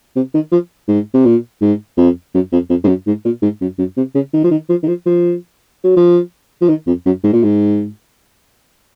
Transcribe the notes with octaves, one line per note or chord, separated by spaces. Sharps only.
C3
D#3
F3
G#2
C3
A#2
G#2
F2
F#2
F2
F2
G#2
F#2
G#2
A#2
G#2
F#2
F#2
C3
C#3
D#3
F3
D#3
F3
D#3
F3
F3
F#3
F3
F3
D#3
F2
F#2
G#2
A#2
G#2